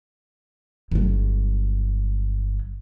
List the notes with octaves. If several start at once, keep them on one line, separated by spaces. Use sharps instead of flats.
G1 F#3